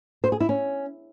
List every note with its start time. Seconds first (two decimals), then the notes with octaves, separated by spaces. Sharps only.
0.24 C5
0.32 G#4
0.40 E4
0.49 C#4